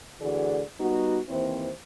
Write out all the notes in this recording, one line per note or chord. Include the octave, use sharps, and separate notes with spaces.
D2 D3 E3 F#4 G#4 D5
G3 B3 D#4 F#4
D#2 E3 C4 E4 C5